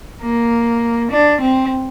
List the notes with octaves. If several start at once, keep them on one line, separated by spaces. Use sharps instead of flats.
A#3
D4
C4